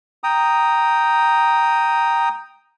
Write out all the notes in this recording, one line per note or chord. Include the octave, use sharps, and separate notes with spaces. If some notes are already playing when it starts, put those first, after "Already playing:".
G5 A#5 D#6